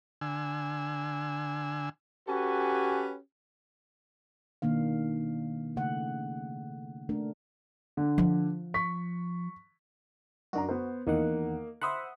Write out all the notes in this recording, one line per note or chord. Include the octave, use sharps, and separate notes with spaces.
D3 G#5 E6
C#4 F#4 G4 A4 B4 G#5
B2 D#3 A#3 D4 F5
C#3 A3 F#5
A3 D4 A#4
D3
F3
C#6 B6
F#2 D4 F#4 A#5
B3 C5
E2 D#3 A#3 D#5 F#5
C5 E5 F#5 B5 C6 D#6